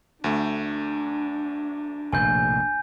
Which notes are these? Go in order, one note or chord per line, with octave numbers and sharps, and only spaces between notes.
D2 A3 D4
F1 A#1 A2 G#5 G6